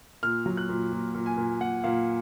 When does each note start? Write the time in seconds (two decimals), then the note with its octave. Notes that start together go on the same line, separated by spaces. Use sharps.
0.23 A#2 F6
0.46 F#3
0.57 F#6
0.69 A#2
0.92 A#2
1.15 A#2
1.26 G#5
1.38 A#2
1.60 A#2 F#5
1.84 A#2 F5